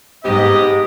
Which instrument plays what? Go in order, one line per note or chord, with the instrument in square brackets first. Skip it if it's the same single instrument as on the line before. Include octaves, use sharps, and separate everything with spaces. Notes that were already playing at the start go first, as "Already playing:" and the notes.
[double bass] G#2 [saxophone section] B3 C4 G4 [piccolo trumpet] D#5